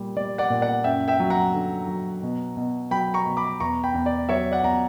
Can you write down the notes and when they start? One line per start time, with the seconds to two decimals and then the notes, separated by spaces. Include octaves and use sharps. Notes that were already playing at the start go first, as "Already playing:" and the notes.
Already playing: A#2 G3
0.17 G3 D5
0.38 D5 F#5
0.50 A#2
0.62 D5 F#5
0.84 F#2 E5 G5
1.08 E5 G5
1.20 F#3
1.30 F#5 A#5
1.54 D3
1.88 F#3
2.23 B2
2.57 B2
2.91 F#3 G5 B5
3.14 A#5 C#6
3.26 B2
3.37 B5 D6
3.60 E2 A#5 C#6
3.84 G5 B5
3.94 E2
4.06 D5
4.29 F#3 C#5 E5
4.51 D5 F#5
4.63 E2 A#5